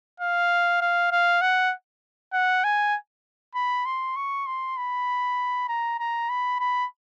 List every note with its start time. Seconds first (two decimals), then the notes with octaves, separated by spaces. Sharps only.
0.20 F5
0.81 F5
1.11 F5
1.41 F#5
2.33 F#5
2.64 G#5
3.55 B5
3.85 C6
4.16 C#6
4.47 C6
4.77 B5
5.69 A#5
5.99 A#5
6.30 B5
6.60 B5